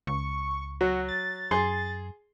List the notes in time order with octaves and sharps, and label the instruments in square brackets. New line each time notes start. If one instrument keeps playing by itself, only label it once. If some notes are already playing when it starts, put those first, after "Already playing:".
[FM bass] C#2 [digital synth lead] C#6
[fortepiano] F#3 [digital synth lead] F#4
[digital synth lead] A6
[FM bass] F#2 [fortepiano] G#4 C6